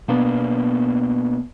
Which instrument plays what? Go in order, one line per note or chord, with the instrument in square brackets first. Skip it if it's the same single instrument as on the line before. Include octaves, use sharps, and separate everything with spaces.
[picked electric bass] B2 A#3 B3 D4